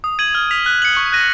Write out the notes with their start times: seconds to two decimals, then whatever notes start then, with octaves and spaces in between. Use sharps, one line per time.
0.04 D#6
0.19 G#6 D#7 F#7
0.35 F6
0.51 B6 F7
0.66 F#6
0.82 C#7 F#7
0.97 C#6
1.12 F#6 A#6 D#7